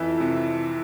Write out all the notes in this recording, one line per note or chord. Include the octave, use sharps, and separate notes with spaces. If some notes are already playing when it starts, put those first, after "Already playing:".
Already playing: F2 E3 E5
C3